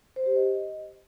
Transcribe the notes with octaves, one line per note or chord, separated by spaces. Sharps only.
C5
G4
D#5